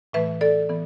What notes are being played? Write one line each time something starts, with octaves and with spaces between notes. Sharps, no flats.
A2 E3 A3 B4 E5
A4 D5
E3 B3